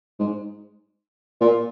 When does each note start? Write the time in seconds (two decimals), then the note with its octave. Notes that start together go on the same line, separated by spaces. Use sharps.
0.19 G#2
1.41 A#2